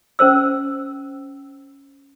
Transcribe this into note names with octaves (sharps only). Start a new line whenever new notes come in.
C#4 A#4 C5 E6